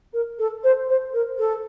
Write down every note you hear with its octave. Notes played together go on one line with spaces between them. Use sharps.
A#4
A4
C5
C5
A#4
A4